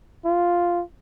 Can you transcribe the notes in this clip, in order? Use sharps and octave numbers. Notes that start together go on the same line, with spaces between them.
F4